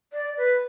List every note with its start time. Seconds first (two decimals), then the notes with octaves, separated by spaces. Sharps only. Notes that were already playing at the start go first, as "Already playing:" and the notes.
0.13 D5
0.37 B4